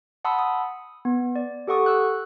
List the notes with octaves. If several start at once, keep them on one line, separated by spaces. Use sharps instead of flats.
F#5 A5 B5 C6 D#6 E6
D#6
B3
D5
G4 A4 F#5 C#6 D#6
E6 F#6